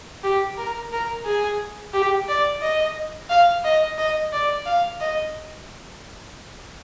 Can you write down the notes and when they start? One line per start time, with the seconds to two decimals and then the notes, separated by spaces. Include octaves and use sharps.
0.24 G4
0.57 A#4
0.92 A#4
1.26 G#4
1.93 G4
2.28 D5
2.62 D#5
3.30 F5
3.64 D#5
3.98 D#5
4.33 D5
4.66 F5
5.00 D#5